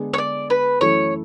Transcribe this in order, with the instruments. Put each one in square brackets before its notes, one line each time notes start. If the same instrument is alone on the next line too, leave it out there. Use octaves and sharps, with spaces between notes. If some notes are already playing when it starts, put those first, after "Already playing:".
Already playing: [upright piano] D3 G#3 B3 D4 G#4
[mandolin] C#5
D5
B4
[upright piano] F#2 E3 A3 E4 A4 [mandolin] C#5